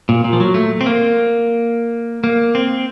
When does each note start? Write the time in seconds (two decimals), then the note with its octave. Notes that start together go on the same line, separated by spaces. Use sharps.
0.09 A#2
0.24 A#2
0.33 F3
0.40 F#3
0.54 A3
0.81 C4
0.86 A#3
2.24 A#3
2.55 C4